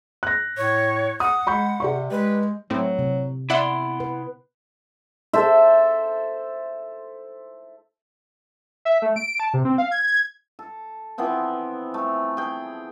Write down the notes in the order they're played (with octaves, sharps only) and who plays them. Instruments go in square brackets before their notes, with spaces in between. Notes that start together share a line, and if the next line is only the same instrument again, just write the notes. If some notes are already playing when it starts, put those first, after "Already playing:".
[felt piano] F#6 A#6
[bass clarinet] A2 [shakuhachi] C#5
[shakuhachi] F#5 [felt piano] D#6
[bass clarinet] G#3 [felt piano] B5 C#6 G6
[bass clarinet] C3 [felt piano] G4 D5 C#6
[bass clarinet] G#3 [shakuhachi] B4
[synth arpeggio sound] A2 C4 [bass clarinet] F#3
[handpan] C3
[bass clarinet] B3 [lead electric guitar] E4 C6 [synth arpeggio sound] D5 E5 F#5
[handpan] B4
[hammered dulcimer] A4 C5 E5
[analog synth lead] E5
A3
D7
A5
C3
C4
F5
G#6
G#6
[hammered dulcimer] A4
E3 F3 B3 C4
A3
G#4 G5